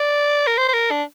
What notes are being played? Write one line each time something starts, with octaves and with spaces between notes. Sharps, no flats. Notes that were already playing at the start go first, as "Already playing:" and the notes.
Already playing: D5
A#4
C5
C5
A#4
D4